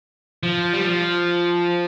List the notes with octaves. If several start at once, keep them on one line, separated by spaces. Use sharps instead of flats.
F3
G3
F3